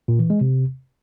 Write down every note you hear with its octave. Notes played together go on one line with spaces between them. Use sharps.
A#2
E3
G#3
C3